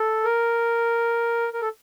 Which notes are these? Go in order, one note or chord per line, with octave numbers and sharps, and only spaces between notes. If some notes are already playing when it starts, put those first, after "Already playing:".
Already playing: A4
A#4
A#4
A4